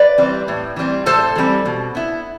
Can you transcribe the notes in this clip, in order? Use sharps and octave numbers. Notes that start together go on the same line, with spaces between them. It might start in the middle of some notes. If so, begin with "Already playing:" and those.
Already playing: B4 D5
E3 G3 C4
A2
E3 G3 C4
A2 A4 C5
E3 G3 C4
B2
B3 E4